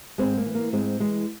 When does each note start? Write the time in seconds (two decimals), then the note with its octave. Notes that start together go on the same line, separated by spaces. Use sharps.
0.18 G#2 G#3 C4
0.37 A#3
0.46 E3
0.54 A#3
0.72 G#2 G#3 C4
1.00 E3 G#3